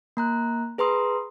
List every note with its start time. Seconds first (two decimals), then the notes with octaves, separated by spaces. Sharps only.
0.17 A#3 A#5 F#6
0.78 G#4 B4 A#5 C6 D#6